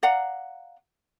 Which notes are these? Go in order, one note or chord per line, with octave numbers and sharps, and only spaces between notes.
D5 F5 F#5 A#5